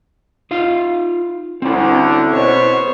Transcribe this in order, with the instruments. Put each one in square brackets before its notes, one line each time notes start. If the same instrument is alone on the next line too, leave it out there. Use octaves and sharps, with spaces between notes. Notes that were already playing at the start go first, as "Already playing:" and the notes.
[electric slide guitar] D#4 F4 F5
[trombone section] D2 D3 [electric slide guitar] C4 C#4 E4
[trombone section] B2 [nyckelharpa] C5 C#5